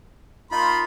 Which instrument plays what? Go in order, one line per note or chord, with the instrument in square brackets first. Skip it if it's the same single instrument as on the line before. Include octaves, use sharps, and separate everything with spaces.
[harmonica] A#3 B5 C6 [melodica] D#4 F4